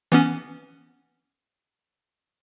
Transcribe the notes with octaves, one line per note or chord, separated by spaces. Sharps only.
E3 B3 C#4